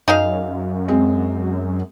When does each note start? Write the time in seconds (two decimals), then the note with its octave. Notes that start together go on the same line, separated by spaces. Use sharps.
0.08 F#2 D#4 G#4 F5
0.88 G#3 C4